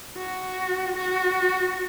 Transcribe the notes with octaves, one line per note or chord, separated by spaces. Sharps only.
F#4
F#4